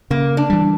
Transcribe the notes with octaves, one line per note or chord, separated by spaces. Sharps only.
C#3 A#3
D4
E3 G3